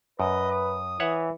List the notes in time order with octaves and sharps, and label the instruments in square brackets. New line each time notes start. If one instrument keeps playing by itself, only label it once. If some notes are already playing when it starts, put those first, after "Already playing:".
[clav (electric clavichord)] F#2 [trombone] B4 [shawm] D#5
[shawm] D#6
[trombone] E3 [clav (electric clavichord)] C#5 E5 F#5